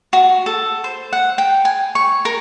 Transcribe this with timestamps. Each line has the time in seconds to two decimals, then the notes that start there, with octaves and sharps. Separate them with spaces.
0.13 F#4
0.46 A4
0.84 C5
1.13 F#5
1.38 G5
1.65 G#5
1.95 C#6
2.25 A#4